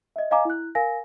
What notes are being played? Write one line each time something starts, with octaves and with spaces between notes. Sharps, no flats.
D#5 E5
D#5 F5 G#5 A#5 D6
E4 F#6
A#4 F5 G#5 A#6